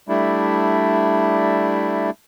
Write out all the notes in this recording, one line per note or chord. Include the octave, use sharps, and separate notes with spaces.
G3 A3 D4 E4